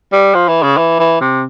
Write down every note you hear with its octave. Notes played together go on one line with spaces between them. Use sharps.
G3
F3
E3
C#3
E3
E3
C3